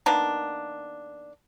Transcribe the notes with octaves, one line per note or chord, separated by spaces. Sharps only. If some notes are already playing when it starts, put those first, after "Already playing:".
D#3 A#3 B3 D4